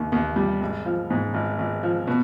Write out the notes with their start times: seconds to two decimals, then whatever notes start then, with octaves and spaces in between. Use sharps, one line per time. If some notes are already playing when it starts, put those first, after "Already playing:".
Already playing: D#2 D#3
0.12 D#2
0.36 G3
0.61 G#1
0.85 F3
1.10 G#2
1.34 G#1
1.58 G#1
1.83 F3
2.07 B2